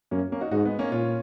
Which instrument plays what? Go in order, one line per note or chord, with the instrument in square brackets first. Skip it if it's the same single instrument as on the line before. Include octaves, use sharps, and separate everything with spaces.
[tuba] F#2 [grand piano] A#3 C#4
[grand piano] A#3 C#4
D#4 F#4
[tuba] G#2 [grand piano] D#4 F#4
[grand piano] G#3 B3
A#3 C#4
[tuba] A#2 [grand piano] C#4 F4